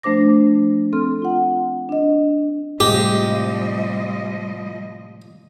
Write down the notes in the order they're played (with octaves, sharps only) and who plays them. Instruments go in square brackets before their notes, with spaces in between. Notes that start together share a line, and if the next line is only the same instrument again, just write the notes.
[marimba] F3 A3 D4 C5 D6 A#6
C4 A4 C6 F6
F4 F#5
D4 D#5
[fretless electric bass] A2 C3 G#3 [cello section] F3 G3 D#5 [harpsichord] G4